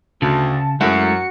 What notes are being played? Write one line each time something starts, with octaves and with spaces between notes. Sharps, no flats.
D2 C#3 A5
F#2 G#3 A3 E4 F#4 C#7